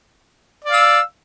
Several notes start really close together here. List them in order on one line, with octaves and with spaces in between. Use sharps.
D5 F5 E6